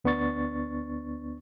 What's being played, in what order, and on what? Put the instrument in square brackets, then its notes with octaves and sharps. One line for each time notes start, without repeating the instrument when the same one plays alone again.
[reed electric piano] D2 B3 D4 C#6 A6